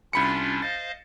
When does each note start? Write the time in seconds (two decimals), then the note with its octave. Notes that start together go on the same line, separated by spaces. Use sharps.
0.13 C2 C#4 D4 F4 B5 C#7
0.62 C5 D#5 F5 A6